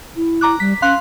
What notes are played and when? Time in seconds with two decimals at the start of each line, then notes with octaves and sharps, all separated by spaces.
0.16 E4
0.41 A#5 D6 F#6
0.60 G3 B6
0.82 C#4 F5 C6 F#6